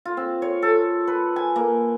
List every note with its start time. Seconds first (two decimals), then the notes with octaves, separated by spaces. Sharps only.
0.05 F4
0.17 C4
0.42 C#5
0.62 A4
1.07 B4
1.36 G#5
1.56 A#3